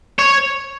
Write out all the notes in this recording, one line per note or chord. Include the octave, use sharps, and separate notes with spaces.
C#5